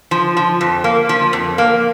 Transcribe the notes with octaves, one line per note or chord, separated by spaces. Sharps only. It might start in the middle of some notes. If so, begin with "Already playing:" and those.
F3
F3
F2
A#3
F3
F2
A#3